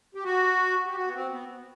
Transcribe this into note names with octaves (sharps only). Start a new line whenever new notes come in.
G4
F#4
G4
F#4
B3
C4
B3